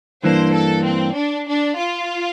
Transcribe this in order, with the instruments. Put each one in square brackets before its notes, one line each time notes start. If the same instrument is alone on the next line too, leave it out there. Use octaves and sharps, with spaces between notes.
[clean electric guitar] G2 E3 A#3 D4 [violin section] C5
[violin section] A4
C4
D4
D4
F4